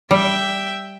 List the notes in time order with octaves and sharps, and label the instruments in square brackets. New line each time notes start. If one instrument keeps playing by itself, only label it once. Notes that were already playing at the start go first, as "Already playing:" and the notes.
[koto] G3 [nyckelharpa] E5 G5